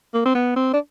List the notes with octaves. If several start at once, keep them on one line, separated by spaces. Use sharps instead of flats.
A#3
C4
B3
C4
D4